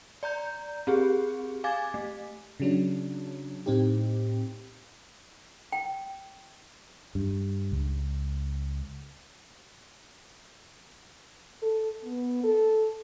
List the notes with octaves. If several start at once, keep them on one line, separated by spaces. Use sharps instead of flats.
D5 A#5 G6
C4 G4 G#4
F5 G#5 D6 G#6 A6
A3
C#3 F#3 D4
A2 C4 D#4 G4
G5
G2
C#2
A4
B3
A4